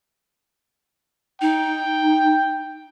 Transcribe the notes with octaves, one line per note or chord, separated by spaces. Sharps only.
D#4 G5